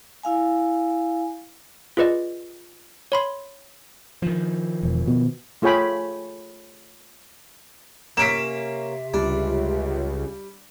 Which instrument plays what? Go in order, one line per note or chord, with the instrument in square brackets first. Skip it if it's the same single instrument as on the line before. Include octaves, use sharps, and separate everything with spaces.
[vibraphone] E4 F5 G#5
[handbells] F4 G#4 B4 D5 D#5
C#5 B5 C6
[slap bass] D#3 F3
[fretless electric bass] E1
B2
[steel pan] A3 F4 G#4 C#5 G5 B5
[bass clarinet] C3 [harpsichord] A#3 C#4 [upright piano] B6 D7 E7
[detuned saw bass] C#2 [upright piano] G3 [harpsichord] D4